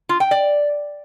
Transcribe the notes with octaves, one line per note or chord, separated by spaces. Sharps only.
F4
G5
D5